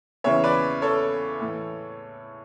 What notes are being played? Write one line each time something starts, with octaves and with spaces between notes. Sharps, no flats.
E2 C#3 E3 C#5 E5
B4 D5
A4 C#5
A2 E3